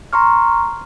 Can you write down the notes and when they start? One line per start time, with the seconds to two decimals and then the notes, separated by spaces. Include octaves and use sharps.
0.13 A#5 C6 C#6 F6